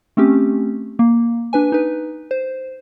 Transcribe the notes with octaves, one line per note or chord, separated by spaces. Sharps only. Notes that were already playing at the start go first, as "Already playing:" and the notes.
A3 C4 C#4 G4
A#3
D4 B4 G#5
D#4 B4
C5